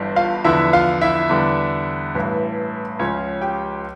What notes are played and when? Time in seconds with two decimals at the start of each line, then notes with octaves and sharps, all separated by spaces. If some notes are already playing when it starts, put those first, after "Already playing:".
Already playing: G1 G2 E3 G3
0.16 F4 F5
0.44 E2 D3 F3 E4 E5
0.73 F4 F5
1.01 E4 E5
1.29 E2 D3 G3
2.15 A1 G2 E3
2.99 C#2 C#3 F3 C#4 C#5
3.41 G4 G5